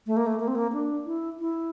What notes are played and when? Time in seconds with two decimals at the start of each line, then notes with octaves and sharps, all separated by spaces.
0.07 A3
0.17 A#3
0.26 A3
0.40 A#3
0.48 C4
0.55 A#3
0.73 D4
1.06 E4
1.40 E4